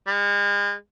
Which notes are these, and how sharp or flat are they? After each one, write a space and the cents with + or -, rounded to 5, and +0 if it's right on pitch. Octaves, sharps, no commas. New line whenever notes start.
G#3 -40